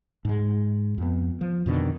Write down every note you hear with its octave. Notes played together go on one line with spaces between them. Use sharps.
G#2 G#3
F2 B3
F3
F2 B2 D3 D#3